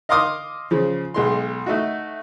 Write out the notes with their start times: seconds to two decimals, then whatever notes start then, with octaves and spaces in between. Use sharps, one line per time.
0.09 D#5 F5 C6 D6 D#6 F6
0.71 C#3 F3
1.14 B1 G#3 C6
1.66 A3 D#4 F#4